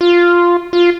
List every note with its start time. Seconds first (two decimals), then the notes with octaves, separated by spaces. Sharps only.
0.01 F4
0.73 F4